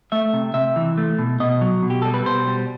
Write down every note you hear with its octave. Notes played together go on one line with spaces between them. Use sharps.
A3 E5
C3
C3 E5
E3
A3
B2
B2 D#5
F#3
B2
G4
G3 A4
B4
B2 C5
G3